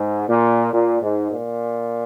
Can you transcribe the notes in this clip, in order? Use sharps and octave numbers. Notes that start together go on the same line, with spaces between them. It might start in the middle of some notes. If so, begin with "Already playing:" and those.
Already playing: G#2
A#2
A#2
G#2
A#2